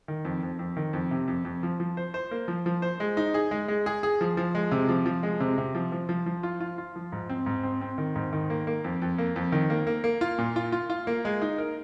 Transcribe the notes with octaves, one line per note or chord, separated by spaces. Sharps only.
D#3
F2
F2
F2
D#3
F2
C3
F2
F2
F3
F3
C5
C5
A#3
F3
F3
C5
G#3
D#4
G#4
G#3
G#3
G#4
G#4
F3
F3
G#3
C3
F3
F3
G#3
C3
C3
F3
F3
F3
F3
F4
F4
F4
F3
G#2
C4
G#2
C4
C4
D#3
G#2
D#3
A#3
A#3
F2
F2
A#3
F2
D#3
A#3
A#3
A#3
F4
A#2
F4
F4
F4
A#3
G#3
D#4
A#4